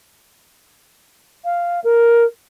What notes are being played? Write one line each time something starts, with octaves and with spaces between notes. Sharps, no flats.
F5
A#4